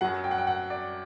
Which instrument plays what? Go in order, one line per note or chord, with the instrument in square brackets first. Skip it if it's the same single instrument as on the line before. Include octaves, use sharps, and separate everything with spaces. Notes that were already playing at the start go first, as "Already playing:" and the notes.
[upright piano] F#2 F#3 F#5
G5
F#5
G5
F#5
D5